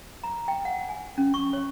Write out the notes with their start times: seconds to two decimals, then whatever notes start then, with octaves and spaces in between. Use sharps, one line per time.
0.24 A#5
0.48 G5
0.65 F#5
0.89 G#5
1.18 C#4
1.34 C#6
1.53 C#5